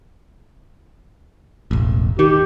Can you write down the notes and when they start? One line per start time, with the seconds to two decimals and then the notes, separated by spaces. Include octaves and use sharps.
1.71 E1 A1
2.19 D#3 G4